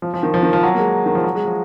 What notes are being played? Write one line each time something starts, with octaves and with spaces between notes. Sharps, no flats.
F3
F3
D#3
F3
D#3
F3
F#3
A#3
G#3
D#3
F3
F#3
G#3
F3